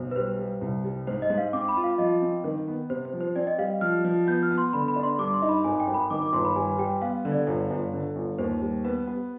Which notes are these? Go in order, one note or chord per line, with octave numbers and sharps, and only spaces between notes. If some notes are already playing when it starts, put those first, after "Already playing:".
Already playing: B1 C5
B4
G3 C5
G3
C2
G3
G#2 C5
D#5
G#2
F5
C4 D6
B5
F4
F5
F3 D#5
C4
D#3
B3
C3 C5
C5
F3
C5
C4 D5
D#5
G3 F5
F3 F6
F3
B3 G6
F6
B3
C6
D3 B5
B5
D4
C6
G2 D6
C6
D#4
B5
G#1 G#5
G5
G#1
B5
D#3 D6
D6
G1 C6
B5
G3 G#5
G3 G5
B3 F5
D3
D5
G1
G1
D3
G1
D#2 C5
G3
B3 B4
B3